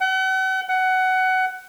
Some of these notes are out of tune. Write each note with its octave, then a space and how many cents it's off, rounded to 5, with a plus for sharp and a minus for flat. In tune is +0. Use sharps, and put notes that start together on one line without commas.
F#5 +40
F#5 +15